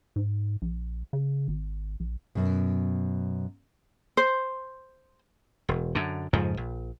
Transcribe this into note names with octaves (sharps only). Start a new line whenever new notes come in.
G#2
A#1
C#3
G#1
A#1
F#2 B2
C5
E1
F#2 D3
F2 G#2 C#3 F3
A#1